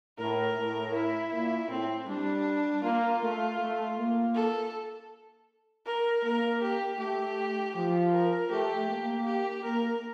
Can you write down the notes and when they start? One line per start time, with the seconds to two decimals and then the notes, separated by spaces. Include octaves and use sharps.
0.18 A2 A#4
0.57 A2
0.94 E4
1.32 A#2
1.69 A2 C4
2.07 G3 D4
2.83 A#3 F4
3.21 A3
3.59 A3
3.97 A#3
4.34 A4
5.86 A#4
6.23 A#3 A#4
6.62 G4
6.99 A3 G4
7.75 F3 G4
8.12 A#4
8.50 A3 G4
8.89 A#3
9.26 G4
9.63 A#3 A#4